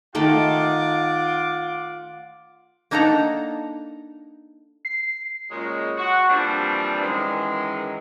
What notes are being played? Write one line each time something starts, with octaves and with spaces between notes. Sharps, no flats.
D#3 A3 F4 D#5 F#5 D6
A#3 D4 D#4 A4 F#5 A#5
C7
A#2 C#3 F#3 G#3
F#4
E3 F3 G3 A#3 C4 D4
F#2 D#3 E3 G#3